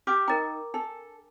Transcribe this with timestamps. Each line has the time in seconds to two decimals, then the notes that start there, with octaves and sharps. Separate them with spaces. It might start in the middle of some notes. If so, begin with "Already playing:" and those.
0.07 G4 G5 D6 F6
0.28 D#4 A#4 G5 A#5 A6
0.74 D4 A4